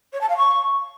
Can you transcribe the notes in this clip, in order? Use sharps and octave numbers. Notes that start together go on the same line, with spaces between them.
C#5
A5
F5
C#6